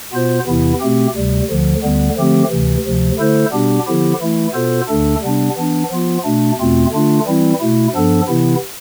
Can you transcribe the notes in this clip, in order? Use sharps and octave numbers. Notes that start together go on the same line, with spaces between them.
B2 B3 F4 C5
E2 C3 E3 B3 E4
B2 A3 C4 G4
D2 C3 G3
D2 D3 F3
D2 D3 G3 B3
D3 F3 A3 C4 G4
D2 C3 E3
D2 C3 F3
D3 A3 E4 A4 C5
B2 G3 B3 D4 G4
D3 F3 B3 E4 G4
E3 A3 E4
B2 B3 F4 A4 C5
D2 D3 A3 D4 A4
C3 G3 B3 D4
E3 B3 D4
F3 B3 F4
B2 A3 D4
E2 B2 A3 C4 F4
D3 A3 D4 F4
E3 G3 C4 E4
B2 A3 E4
G2 F3 B3 D4 A4
C3 E3 B3 E4